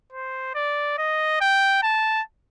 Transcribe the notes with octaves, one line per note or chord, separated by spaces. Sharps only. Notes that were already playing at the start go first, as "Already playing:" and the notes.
C5
D5
D#5
G5
A5